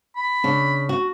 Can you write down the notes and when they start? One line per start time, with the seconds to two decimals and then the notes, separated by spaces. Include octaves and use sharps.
0.16 B5
0.44 C#3 D4
0.89 F#4